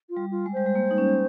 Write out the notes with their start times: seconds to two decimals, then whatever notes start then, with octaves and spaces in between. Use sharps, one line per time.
0.10 F4
0.17 G3
0.31 F4
0.46 G#3
0.53 G3 C5
0.66 G#3
0.75 A#3
0.91 D#4
0.98 C#4